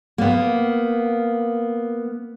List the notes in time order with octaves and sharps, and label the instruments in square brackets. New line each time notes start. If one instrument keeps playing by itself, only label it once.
[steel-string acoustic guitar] A#3 B3